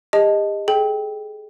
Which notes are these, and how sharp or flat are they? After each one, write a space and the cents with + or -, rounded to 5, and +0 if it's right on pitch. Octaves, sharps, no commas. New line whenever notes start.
G4 +40 D#5 +0 A5 +0
G#4 +35 G5 +0